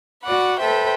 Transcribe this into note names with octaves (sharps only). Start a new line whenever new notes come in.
F#4 D5 F#5 B5
A4 B4 C5 E5 G5